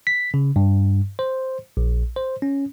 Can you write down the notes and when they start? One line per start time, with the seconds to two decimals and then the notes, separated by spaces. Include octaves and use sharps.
0.07 B6
0.34 C#3
0.56 G2
1.19 C5
1.77 A#1
2.16 C5
2.42 C#4